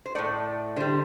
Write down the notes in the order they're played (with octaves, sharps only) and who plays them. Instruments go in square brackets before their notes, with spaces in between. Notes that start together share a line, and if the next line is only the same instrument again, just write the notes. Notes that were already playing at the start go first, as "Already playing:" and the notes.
[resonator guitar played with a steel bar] C5
A2 A3 D5
D3 G3 C5